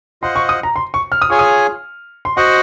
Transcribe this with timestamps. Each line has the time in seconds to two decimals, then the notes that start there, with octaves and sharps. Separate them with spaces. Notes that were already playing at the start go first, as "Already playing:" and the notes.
0.22 F4 C5 D#5 F#5 C6
0.36 C#6
0.49 D#6
0.63 A#5
0.76 C6
0.94 C#6
1.12 F6
1.22 D#6
1.30 F4 G#4 C#5 G#5 C#6
1.39 D#6
2.25 C6
2.37 F#4 C5 D#5 F#5 C#6